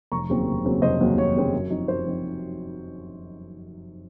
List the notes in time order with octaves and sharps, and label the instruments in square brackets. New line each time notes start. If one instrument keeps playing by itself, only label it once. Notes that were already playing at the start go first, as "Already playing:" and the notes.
[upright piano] F1 A#5 C#6
D#2 C#3 F#3 C4
F1
D#2 C#3 F#3 C4
F1 C5 D#5
D#2 C#3 F#3 C4
F1 C#5
D#2 C#3 F#3 C4
F#2
F3 C4 D#4
F#2 C5
F3 C4 D#4